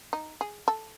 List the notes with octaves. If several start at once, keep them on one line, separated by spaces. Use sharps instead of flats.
D#4
G#4
A4